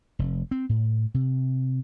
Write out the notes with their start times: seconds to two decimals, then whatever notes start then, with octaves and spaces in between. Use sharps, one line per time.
0.19 F1
0.51 C4
0.69 A2
1.14 C3